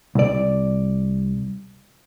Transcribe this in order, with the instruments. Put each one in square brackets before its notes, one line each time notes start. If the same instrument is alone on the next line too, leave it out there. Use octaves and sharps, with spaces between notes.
[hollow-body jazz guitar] C2 D5